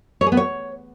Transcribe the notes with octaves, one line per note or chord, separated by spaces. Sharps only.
C#5
G#4
B3
C#5